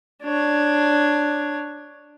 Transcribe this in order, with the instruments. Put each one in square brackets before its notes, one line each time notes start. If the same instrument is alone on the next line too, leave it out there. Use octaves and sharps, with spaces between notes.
[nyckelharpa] D4 C#5